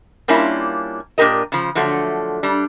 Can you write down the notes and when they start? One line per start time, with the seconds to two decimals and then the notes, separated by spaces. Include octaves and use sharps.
0.28 G3 A#3 C#4 D4 E4 F4
1.18 A#2 D4 G4 A#4 D#5
1.52 C#3 F3
1.75 D3 F3 F#3 A3
2.43 G3 D4